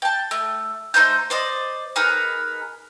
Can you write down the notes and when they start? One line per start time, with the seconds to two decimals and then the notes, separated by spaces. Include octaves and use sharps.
0.02 G5 A5
0.31 A3
0.94 A3 D#4 C5 G6
1.30 C5 D5 D#5
1.96 D#4 G#4 A#4 B4